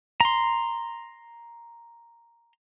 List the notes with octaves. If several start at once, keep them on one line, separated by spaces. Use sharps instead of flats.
A#5 C6